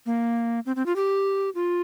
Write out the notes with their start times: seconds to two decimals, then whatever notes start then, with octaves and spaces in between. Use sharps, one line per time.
0.06 A#3
0.66 C4
0.76 C4
0.86 F4
0.96 G4
1.55 F4